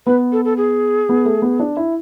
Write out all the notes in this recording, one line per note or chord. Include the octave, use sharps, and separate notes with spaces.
B3 B4
A4
A4
G#4
B3
A3
B3
D4
E4